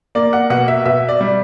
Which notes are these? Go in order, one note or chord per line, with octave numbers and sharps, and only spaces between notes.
A#3 D5
F#5
B2 F#5
E5
B2 E5
D5
G3